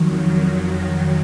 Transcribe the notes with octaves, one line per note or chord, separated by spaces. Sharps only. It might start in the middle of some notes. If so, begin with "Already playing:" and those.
Already playing: F2 D#3 F#3